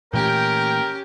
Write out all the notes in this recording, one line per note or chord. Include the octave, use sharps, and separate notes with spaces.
A#2 E3 A3 C#4 G4 A#4 G5